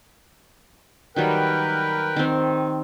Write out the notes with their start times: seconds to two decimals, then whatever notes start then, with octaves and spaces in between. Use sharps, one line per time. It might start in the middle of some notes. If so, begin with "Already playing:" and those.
1.16 D#3 F#3 G3 A#4 B4 G5
2.16 D#3 C4